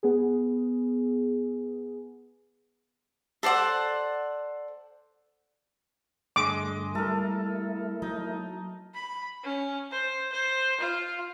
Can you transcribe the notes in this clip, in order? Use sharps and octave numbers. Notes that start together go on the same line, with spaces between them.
B3 G#4
A4 C5 D5 F#5
G2 D3 G#3 A3 D#5 D6
G3 A3 A#3 E4 A4 A#4
F#3 D#4
B5
C#4
C5
C5
F4